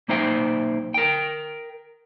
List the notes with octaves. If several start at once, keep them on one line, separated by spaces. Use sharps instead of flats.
B1 A#3 D#4 C5 E5 G5
A#4 G5